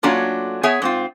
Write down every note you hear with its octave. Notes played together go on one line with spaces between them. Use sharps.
F#3 A3 A#3 C#4 D4 F4
B3 G#4 C#5 E5 G#5
G#2 C4 F4